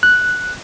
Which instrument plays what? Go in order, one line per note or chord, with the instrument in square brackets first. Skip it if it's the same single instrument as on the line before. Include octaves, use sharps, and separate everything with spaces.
[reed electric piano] F#6